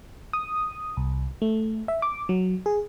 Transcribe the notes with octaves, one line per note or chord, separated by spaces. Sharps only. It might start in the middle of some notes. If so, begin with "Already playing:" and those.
D#6
C2
A3
E5
D6
F#3
G#4